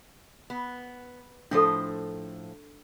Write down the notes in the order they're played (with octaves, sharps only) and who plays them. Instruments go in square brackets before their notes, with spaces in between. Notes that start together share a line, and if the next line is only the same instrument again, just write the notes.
[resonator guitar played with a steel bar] B3
[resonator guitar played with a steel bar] A2 F3 C5 [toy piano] D4 A4